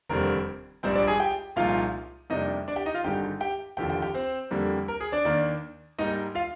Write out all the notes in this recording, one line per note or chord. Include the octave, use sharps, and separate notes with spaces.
F1 D#2 D3 G3 C4 A#4
A#1 G#2 G3 C4 D4 C5
D4 D5
G#4 G#5
G4 G5
C2 A#2 F3 G#3 D#4 F4 F5
F2 C3 G3 A#3 D4 D#4 D#5
D4 D5
G4 G5
D#4 D#5
F4 F5
G#1 G2 D3 G#3 D#4 G4 G5
G4 G5
F1 D#2 D3 F3 G4 G5
G4 G5
G4 G5
C4 C5
F2 D3 G3 A#3
A#4
G#4
D4 D5
D#2 D#3 A#3 D4
G#2 G3 A#3 D#4 D#5
F4 F5